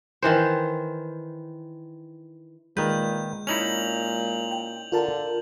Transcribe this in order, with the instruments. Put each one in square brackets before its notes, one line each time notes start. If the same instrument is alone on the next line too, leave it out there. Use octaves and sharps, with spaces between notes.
[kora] D#3 E3 C5
[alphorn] A#2 [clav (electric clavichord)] D#3 B4 [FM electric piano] G#3 [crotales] G6
[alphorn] A#2 [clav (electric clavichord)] C#4 D#4 E4 [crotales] F7 F#7
[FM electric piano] G5
[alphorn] D3 [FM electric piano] F4 A#4 A5